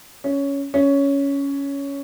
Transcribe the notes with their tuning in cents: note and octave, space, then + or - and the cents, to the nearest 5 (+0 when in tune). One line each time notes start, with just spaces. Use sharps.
C#4 +10
C#4 +10